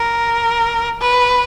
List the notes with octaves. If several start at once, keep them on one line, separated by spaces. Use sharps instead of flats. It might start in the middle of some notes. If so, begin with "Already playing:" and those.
Already playing: A#4
B4